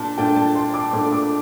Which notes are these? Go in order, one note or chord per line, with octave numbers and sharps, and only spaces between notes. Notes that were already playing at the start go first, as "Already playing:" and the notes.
Already playing: A#2 D4 A5
A#2 A3 D4 G5
A5
C6
D6
A#2 A3 D4 D6
D6